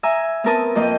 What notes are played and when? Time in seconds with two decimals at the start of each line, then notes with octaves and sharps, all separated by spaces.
0.03 E5 G#5 A#5 D#6
0.44 B3 C4 A#4 A5 D#6
0.75 F2 A#3 D#5 G5